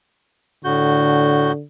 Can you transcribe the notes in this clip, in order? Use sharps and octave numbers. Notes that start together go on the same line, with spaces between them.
A2 D3 F#4 G6